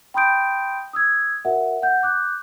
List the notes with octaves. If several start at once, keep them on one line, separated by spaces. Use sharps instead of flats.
G5 B5 C6 D#6 G6 D7
D#6 E6 G#6
F#4 A#4 E5 F#5
F#5 G6
D6 F#6 G6